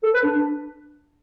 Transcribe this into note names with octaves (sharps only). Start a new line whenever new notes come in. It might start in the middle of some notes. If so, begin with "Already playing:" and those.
A4
B4
D4
D4